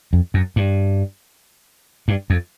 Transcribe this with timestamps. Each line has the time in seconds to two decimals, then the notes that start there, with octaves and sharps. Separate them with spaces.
0.13 F2
0.34 F#2
0.56 G2
2.08 G2
2.30 F2